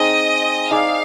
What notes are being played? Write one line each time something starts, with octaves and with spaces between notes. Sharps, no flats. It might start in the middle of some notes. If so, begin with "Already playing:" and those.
Already playing: C4 D#4 G#4 D#5
D#4 G#4 D5 F5